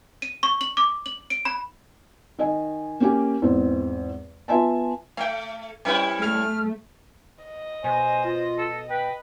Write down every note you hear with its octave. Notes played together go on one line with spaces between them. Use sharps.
D#7
C#6
F#7
D6
F#7
D7
B5
D#3 D#5 G#5
A#3 C#4 G4 G#5
E2 G#2 C4
B3 F4 E5 G#5 A5
A3 F5 G5
C3 G3 C#4 E4 B4 G5
A3 F6
D#5
B2 C5 G#5
F4
A4
B4 G5